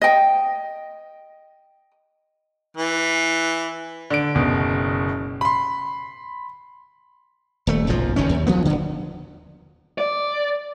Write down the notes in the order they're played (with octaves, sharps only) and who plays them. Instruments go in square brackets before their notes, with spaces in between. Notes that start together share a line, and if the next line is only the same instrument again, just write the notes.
[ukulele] D#5 G5
[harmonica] E3
[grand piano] D3 D7
F#1 B2
B5 C6
[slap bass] D#1 A3
F#1 B1 G#2 F3
F#1 F2 D#3 C#4
D#2
D2 F3 A#3 B3
D#1 D3
[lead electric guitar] D5